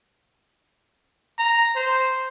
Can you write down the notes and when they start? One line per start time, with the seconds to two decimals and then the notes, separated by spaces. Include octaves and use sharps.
1.38 A#5
1.75 C5